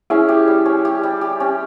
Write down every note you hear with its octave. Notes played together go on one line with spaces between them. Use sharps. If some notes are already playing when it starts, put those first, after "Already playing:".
C#4 E4 G#4
G4
G3
C#4
G4
G3
G4
C#4